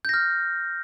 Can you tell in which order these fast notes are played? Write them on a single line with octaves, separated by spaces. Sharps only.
G6 A#6 F6